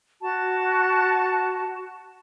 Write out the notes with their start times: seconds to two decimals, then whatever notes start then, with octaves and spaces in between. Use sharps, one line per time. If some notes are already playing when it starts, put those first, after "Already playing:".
0.20 F#4 A5